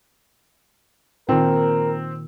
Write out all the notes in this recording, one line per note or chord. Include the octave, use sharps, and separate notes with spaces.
A#2 D#3 C4 A#4